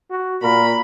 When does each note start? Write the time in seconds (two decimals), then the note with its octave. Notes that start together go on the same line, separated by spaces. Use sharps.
0.11 F#4
0.43 A#2 A#4 B5